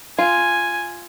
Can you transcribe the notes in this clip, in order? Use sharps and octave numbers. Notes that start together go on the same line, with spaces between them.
F4 G#5